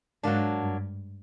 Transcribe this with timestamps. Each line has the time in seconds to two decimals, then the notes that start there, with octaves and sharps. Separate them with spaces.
0.23 G#2 F#3 A#3 D4
0.61 G2